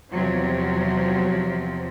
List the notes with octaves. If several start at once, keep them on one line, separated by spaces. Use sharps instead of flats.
E2 C3 F3 F#3